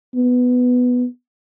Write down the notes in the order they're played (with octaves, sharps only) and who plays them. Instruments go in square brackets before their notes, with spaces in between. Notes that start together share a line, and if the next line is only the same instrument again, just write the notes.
[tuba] B3